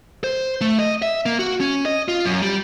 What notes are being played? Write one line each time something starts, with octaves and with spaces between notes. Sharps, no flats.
C5
A3
D#5
E5
A#3
F#4
C#4
D#5
F4
F#2
G3